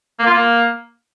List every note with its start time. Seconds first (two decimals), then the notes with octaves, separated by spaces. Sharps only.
0.19 A#3
0.26 F4
0.34 A#3